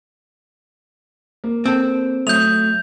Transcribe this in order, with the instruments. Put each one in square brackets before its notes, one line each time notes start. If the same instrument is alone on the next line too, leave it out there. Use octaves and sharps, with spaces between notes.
[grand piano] A#3
[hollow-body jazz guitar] C4 A4
[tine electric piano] F#3 A3 [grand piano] D#6 [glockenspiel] G6 F7